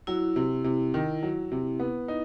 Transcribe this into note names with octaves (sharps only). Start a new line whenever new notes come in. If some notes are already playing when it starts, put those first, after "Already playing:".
F#3 E4
C3
C3
D#3
F#3
C3
B3
D#4